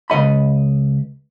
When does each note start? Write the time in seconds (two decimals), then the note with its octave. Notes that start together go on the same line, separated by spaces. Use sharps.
0.10 C#2 G2 D#5 B5